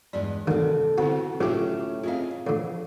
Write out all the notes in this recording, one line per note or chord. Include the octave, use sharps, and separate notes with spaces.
E2 G2 G#3 D5
D2 C3 D#3 G3 A4
D3 B3 C4 E4 F#4
B1 A2 C#4 F4 G4 E5
C4 F4 G#4 D#5 F5
A2 D3 F3